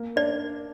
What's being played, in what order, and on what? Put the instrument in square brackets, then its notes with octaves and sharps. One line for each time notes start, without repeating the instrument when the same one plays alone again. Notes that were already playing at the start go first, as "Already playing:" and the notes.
Already playing: [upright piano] A#3
[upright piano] D4 [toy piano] D5